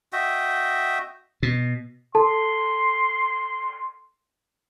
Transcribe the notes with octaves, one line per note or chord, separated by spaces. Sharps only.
F#4 D#5 E5 G5
B2
A4 A5 C6